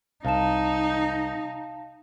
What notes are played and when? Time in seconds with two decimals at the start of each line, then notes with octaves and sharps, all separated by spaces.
0.25 C2 D#4 F5 A5 E7